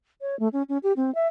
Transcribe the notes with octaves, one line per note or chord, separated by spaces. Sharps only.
C#5
A3
C#4
C#4
G4
C4
E5